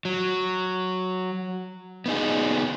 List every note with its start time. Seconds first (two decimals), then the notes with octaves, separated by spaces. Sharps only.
0.05 F#3
2.06 B3 D#4 G#4